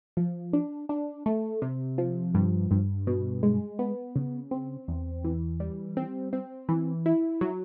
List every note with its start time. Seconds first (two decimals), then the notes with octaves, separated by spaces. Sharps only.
0.17 F3
0.53 D4
0.89 D4
1.26 A3
1.62 C3
1.98 F3
2.34 G2
2.71 G2
3.07 B2
3.43 G#3
3.79 B3
4.16 C#3
4.51 C4
4.88 E2
5.24 E3
5.60 G3
5.97 C4
6.33 C4
6.69 E3
7.06 E4
7.41 F#3